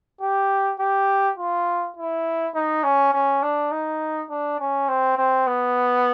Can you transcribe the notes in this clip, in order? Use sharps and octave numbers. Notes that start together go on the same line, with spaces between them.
G4
G4
F4
E4
D#4
C#4
C#4
D4
D#4
D4
C#4
C4
C4
B3